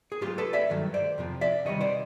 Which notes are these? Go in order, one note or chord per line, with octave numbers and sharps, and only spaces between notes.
G#4
A2 F#3 A3 F4 G4
A4 B4
D5 E5
G2 D#3 F#3 A3
C5 D5
F2 C3 F3
D5 E5
C3 D#3 G3 C#5 D#5
C5 D5